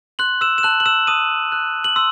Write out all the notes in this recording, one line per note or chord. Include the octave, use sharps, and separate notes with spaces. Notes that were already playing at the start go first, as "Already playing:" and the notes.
C6 F#6 F#7
E6 E7
E7
A5 F#6 F#7
F#7
E6 E7
A5 D#6 D#7
F#6
F#7
C6 E6